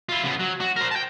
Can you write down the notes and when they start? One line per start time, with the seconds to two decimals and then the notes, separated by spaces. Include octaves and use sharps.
0.09 E4 F4
0.24 C#3 B3
0.40 F#3
0.61 F#4
0.76 A#4 C5
0.91 G5 A5